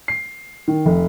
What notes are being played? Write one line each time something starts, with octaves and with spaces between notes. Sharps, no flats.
C7
D#3
F1